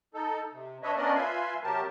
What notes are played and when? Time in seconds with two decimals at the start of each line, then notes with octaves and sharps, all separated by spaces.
0.14 D#4 A4
0.52 C3
0.83 D4 B4 C#5 D#5 E5
0.97 B3 C#4 D4 A#4 D5 D#5
1.15 F4 B4 E5 G#5 C6
1.63 C3 F#3 G4 A#4 A5